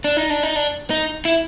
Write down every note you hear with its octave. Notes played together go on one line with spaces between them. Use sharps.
D4
D#4
D4
D#4
D4
D#4
E4